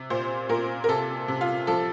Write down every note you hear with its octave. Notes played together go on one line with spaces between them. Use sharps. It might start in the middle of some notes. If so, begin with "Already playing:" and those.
Already playing: C3
A#2 C5
A#2 A#4
A#4
C3 A4
C3
F4
F3 A4